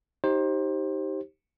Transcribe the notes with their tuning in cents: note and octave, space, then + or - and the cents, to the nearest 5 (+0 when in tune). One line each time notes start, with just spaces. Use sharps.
D#4 +10 G4 -10 C5 +25